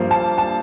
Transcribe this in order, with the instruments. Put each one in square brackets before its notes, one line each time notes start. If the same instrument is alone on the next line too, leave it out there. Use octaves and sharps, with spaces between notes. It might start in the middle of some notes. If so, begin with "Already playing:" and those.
Already playing: [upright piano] G2 F3 A#3
A5
A5